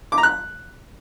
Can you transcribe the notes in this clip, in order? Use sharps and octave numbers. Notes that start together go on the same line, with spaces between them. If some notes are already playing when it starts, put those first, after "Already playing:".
D6
A#5
F#6